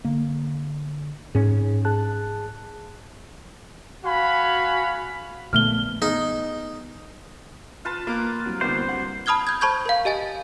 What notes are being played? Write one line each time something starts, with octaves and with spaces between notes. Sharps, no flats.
D3 A#3
G#2 C#4 G#4
G#4 A5 F#6
F#4 F5 G#5 B5
A#1 A#2 D3 D#3 A3 B3 F6 G7
B3 D#4 G#4
F4 B4 A5
A#3 D6
C2 F#3
C2 D3 A#3 B3 F#4 G4 C5
F#5
A5 B5 D#6 F6 G#6 G7
G6 G#6
C5 A5 B5 C#6 G6 G#6
A#4 F5
G4 D#5 G#5 A6